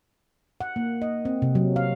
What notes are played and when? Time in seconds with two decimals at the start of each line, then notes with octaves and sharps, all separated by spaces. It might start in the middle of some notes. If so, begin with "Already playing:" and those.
0.61 F#5
0.76 A#3
1.02 D#5
1.25 C4
1.42 C3
1.55 F#3
1.76 F5